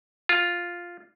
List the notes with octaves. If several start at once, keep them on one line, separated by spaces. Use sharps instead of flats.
F4